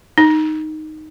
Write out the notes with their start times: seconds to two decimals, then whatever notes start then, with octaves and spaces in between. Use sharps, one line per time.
0.18 D#4